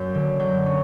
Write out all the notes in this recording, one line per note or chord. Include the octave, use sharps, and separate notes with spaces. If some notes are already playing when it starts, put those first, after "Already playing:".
Already playing: F#2 A#3 G6
D3
F#3 G6
C#4